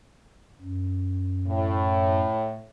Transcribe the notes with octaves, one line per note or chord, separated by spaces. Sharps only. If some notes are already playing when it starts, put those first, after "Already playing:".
F#2
A2